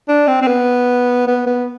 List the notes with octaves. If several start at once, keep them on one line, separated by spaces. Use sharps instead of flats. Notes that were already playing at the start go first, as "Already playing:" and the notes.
D4
C4
C4
B3
B3
B3